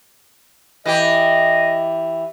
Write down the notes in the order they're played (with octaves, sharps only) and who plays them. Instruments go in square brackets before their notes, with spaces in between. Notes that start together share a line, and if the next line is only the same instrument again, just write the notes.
[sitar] E3 G4 [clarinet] D#5